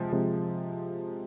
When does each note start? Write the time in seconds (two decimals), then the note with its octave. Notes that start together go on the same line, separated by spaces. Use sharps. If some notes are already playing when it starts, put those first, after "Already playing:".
Already playing: C3 F3 G#3
0.12 C3 F3 G#3